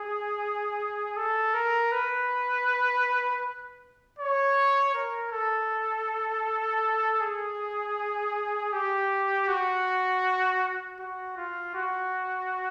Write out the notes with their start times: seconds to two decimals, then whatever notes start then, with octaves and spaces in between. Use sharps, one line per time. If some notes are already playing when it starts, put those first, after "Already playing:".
Already playing: G#4
1.17 A4
1.54 A#4
1.92 B4
4.19 C#5
4.95 A#4
5.32 A4
7.21 G#4
8.73 G4
9.48 F#4
11.00 F#4
11.37 F4
11.75 F#4